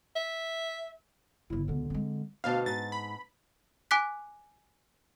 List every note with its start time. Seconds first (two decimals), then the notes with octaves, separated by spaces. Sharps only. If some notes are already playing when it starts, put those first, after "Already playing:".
0.16 E5
1.50 G1 C#3 E4
1.68 C#2 B2 D3
1.90 G#3 C4
2.44 D2 B2 F5 A5
2.66 G#2 A6
2.92 B5
3.91 G#5 D6 F#6 B6